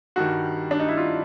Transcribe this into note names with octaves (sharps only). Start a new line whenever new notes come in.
G2 D#3 G3 F#4
D4
D#4
E4
F4